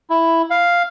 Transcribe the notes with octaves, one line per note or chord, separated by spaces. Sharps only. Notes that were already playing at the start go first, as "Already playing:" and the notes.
E4
F5